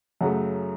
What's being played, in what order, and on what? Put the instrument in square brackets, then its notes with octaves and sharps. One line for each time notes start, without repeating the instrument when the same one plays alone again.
[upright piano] F#2 C#3 F#3 A3 F#5